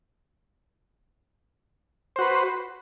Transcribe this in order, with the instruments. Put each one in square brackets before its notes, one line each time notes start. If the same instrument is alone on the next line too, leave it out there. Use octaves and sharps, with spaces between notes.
[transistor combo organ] C5
F#4
B4